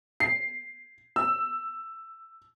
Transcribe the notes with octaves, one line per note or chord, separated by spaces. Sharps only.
C7
E6